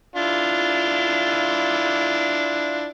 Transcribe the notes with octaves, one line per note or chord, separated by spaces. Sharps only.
D4 E4 F4